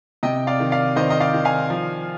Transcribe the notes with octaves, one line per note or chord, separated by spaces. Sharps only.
C3 D#5 G5
D5 F5
D#3
D5 F5
D#3 C5 D#5
D#5
D5 F5
D#3
F5 G#5
F3